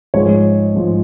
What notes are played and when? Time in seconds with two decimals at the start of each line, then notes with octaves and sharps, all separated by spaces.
0.14 G#2 F3 G#3 C#5
0.74 G#2 F3 G#3